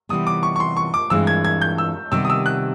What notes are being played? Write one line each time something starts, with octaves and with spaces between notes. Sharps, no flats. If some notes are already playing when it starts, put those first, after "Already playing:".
C3 E3 G3 B3 D#6
D6
C#6
C#6
C6
C#6
D6
G2 E3 G#3 C4 E6
G#6
G#6
G6
E6
C3 D#3 G3 B3 E6
D#6
E6
F#6